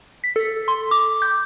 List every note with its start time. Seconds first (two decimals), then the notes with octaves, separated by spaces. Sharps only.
0.24 B6
0.36 A4
0.68 C6
0.91 D6
1.22 G6